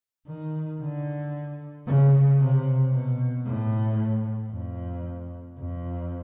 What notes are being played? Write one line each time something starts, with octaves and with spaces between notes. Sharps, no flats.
D#3
D3
C#3
C3
B2
A2
F2
F2